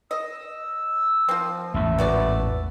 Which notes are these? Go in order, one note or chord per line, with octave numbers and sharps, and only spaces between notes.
D#5 E6
F3 C4 F4
A1 E2 G#2 A3 E6
B3 F#4 D5